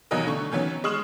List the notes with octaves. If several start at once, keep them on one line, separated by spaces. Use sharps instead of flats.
D#2 B2 E3 F#3 A#4 D#5
D3 A3 C#6
D#3 E3 F#3 B3 C#4
G#3 C#6 D#6 F6 E7 F#7